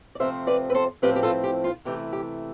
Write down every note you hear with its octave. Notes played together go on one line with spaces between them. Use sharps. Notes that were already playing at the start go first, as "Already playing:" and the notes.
D5
C3 F3 A3 C4 C5 E5
B4 D5
B4
A4 C5
A2 F3 C4 E4 G4 B4
G4
F4 A4
G4
F4
C3 E3 A3 E4 G4
G4